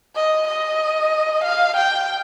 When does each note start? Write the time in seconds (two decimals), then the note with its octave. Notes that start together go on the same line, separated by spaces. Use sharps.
0.16 D#5
0.48 D#5
1.44 F5
1.77 G5